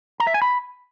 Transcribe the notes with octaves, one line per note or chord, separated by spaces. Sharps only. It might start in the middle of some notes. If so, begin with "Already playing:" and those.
A#5
E5
G#5
B5